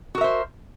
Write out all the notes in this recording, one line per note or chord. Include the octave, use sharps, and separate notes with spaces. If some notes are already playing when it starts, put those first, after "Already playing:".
F#4 A#4 C5 E5